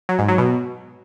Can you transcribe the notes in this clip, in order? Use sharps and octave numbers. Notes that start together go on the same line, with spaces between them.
F#3
G#2
F#3
B2